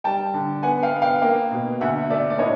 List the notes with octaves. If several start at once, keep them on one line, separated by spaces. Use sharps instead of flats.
G3 G5 A5
D3
B3 F#5 G#5
F5 G5
B3
F5 G5
A#3 F5 G5
B2
D2 E5 F#5
A3 D5 E5
D5
A2 C#5 D#5